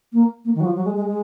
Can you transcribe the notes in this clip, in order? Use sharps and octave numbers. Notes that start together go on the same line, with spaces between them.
A#3
A#3
D#3
F#3
F3
F#3
G#3
G#3
G#3